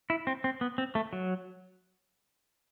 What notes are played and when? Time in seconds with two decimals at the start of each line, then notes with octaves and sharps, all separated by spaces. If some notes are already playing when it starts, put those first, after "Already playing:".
0.10 E4
0.27 C4
0.44 C4
0.61 B3
0.78 C4
0.95 A3
1.13 F#3